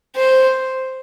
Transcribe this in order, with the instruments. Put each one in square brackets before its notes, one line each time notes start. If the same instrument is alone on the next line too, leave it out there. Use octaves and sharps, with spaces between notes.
[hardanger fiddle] C5